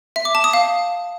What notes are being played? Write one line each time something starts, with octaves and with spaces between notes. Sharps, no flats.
E5
D6
A5
D#6
F5